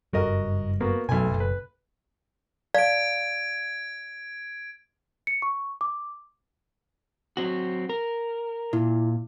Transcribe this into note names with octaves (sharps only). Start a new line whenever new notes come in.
F#1 G2 G3 F#4 A#4 D#5
A#3 B3 F#4
B1 B2 F#3 A3 G#5
F#1
B4
D5 F5 A5 G#6 D7
C#7
C#6
D6
F#3 C4 F#4
A#4
A#2 E4